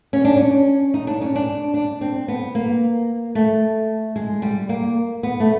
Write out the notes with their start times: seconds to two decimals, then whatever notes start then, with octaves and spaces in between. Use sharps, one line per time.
0.13 C#4
0.25 D4
0.37 C#4
0.94 D#4
1.07 D4
1.21 C#4
1.35 D4
1.74 D4
2.01 C4
2.28 B3
2.55 A#3
3.35 A3
4.16 G#3
4.42 G3
4.69 A#3
5.23 B3
5.40 A3